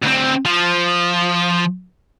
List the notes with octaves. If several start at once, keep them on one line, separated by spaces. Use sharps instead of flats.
D2 C4
F3